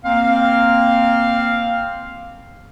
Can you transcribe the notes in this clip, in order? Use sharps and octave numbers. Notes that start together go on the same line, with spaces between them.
A#3 C4 F5